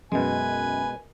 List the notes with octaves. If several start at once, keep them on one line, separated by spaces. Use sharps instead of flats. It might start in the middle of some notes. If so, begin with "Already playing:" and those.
F#2 B2 G#3 B4 G#5